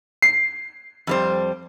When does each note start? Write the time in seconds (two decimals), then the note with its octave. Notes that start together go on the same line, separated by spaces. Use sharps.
0.22 C7
1.07 F2 G3 C5